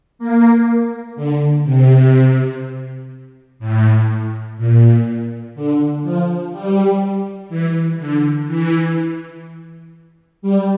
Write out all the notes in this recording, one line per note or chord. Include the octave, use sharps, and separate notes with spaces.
A#3
D3
C3
A2
A#2
D3
F3
G3
E3
D3
E3
G3